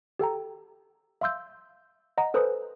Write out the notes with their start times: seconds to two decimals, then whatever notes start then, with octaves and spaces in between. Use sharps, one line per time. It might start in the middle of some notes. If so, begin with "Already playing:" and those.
0.19 G4 A4 G5 A#5
1.21 E5 F5 C6 E6 G6
2.18 D#5 F#5 A#5
2.34 A4 B4 C5 G#5 A#5 D#6